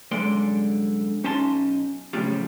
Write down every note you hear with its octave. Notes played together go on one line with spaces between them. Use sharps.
C2 F#2 D3 G#3 D5 C6
B1 C#4 D#4 A5 C6
F#2 A2 C#3 F3 G3